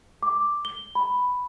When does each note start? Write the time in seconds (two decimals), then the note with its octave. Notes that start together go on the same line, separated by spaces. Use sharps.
0.23 D6
0.65 G7
0.95 B5